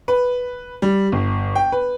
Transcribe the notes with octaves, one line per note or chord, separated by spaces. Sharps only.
B4
G3
G1
G5
B4